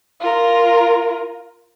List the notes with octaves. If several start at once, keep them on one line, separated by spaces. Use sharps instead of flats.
F4 A#4